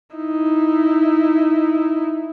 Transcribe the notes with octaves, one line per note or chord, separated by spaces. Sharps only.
D#4 E4